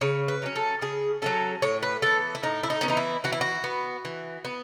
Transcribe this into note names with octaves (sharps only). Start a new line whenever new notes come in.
C#3 C#5
B4
F#3 A3 C#4
A4
C#3 G#4
F#3 A3 C#4 A4
A2 C#5
B4
E3 B3 A4
E4
A2 D#4
E4
D#4
B3 C#4
E3 D#4
E4
E3 F#4
E4
F#4
B3
E3
B3